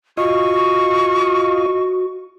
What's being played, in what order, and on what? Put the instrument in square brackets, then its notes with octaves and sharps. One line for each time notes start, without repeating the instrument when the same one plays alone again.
[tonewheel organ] F4 D#5 [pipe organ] F#4 [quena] C#6